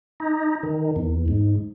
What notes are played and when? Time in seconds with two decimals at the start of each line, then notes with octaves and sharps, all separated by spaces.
0.20 D#4
0.63 D#3
0.96 E2
1.28 G#2